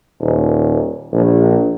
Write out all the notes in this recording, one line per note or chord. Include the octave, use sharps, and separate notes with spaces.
D#1
A#1